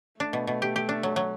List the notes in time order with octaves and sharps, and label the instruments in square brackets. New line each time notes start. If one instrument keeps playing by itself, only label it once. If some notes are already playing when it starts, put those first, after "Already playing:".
[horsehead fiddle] A3 [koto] D4
[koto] B2
B2
G4
G4
D4
F#3
F#3